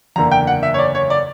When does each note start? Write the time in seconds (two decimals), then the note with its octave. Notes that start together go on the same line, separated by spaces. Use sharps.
0.16 F#1 E2 D3 A#3 A#5
0.32 G5
0.47 F#5
0.63 E5
0.74 C#5
0.78 D5
0.95 C#5
1.10 D5